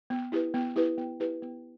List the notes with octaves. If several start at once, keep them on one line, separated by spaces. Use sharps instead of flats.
B3
E4 G4 B4
B3
E4 G4 B4
B3
E4 G4 B4
B3